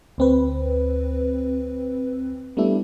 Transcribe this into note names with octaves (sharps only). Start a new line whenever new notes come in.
D2 C4 B4
G3 A3 B3 D4 E4 G4